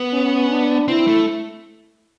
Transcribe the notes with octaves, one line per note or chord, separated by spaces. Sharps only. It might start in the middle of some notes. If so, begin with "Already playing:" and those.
Already playing: B3
C#4
D4
C4 E4
A3